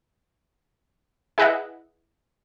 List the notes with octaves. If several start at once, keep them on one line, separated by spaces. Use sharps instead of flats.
E4 G#4 B4 D#5 E5 F#5